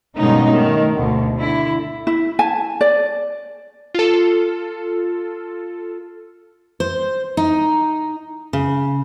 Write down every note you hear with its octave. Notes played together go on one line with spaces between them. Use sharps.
G2 B2 D#3 G#3 C#4 D#4
D#3 A3
D2 G#2 B2 D3
D3 E4
E4
G#5 A5
D5
F4 A4
C5
D#4
C#3